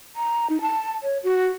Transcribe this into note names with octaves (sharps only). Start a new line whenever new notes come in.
A#5
D#4
A5
C#5
F#4